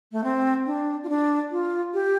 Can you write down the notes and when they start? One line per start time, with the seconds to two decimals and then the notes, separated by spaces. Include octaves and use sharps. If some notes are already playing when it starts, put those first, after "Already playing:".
0.12 A3
0.24 C4
0.66 D4
1.04 F4
1.09 D4
1.51 F4
1.94 G4